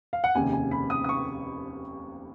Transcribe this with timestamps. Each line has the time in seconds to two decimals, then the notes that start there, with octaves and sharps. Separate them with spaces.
0.13 F5
0.24 F#5
0.35 F1 D#2 C#3 G#5
0.53 G#5
0.71 B5
0.90 D#6
1.04 D#6
1.09 C#6